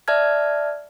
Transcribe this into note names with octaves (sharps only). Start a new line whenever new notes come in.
D5 E5 A5 F6 G#6